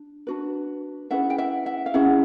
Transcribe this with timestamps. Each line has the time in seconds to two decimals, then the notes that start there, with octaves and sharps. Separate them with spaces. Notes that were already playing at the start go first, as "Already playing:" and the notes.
Already playing: D4
0.27 D4 F#4 B4
1.11 C#4 E4 G#4 B4 E5 F#5
1.30 G5
1.38 E5 F#5
1.66 E5 F#5
1.86 F5
1.94 C#4 E4 G#4 E5 F#5